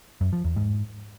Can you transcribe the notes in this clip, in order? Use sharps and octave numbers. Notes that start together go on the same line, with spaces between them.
F#2
F3
E2
G#2